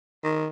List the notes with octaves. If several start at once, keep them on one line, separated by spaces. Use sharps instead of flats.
D#3